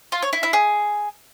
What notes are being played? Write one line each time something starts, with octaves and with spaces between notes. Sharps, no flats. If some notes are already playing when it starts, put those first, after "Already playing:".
F4
C#5
E4
E4
G#4